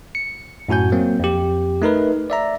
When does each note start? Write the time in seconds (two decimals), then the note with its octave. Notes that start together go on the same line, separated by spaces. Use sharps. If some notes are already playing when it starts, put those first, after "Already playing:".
0.15 C#7
0.68 F#2 A2 F#4 G#5 G6
0.92 F#3 A#3 C4
1.19 F2 G4
1.82 A3 D#4 A#4 B4
2.30 D5 E5 A#5